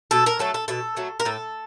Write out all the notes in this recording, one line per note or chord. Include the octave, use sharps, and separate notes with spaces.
B2 A4
A#4
F#3 A3 A4
A4
B2 A4
F#3 A3
A#4
A2 A4